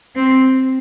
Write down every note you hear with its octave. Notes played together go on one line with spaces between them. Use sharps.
C4